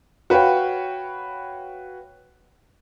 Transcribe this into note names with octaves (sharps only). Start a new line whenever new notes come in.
F#4 B4 C#5 F5 G5